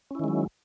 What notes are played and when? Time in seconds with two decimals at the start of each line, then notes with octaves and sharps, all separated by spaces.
0.11 C#4
0.15 E4
0.19 D#3
0.24 G#3
0.28 F#3